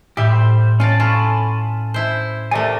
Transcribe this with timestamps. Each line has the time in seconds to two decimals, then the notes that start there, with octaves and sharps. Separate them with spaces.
0.17 A2 G3 G4 E5 G5 B5
0.31 C5
0.80 C#4 F4 D5 A5
1.00 C#4 F4 A4 G#5 A5 B5
1.94 E4 C5
2.51 C3 A3 A#4 D5 G#5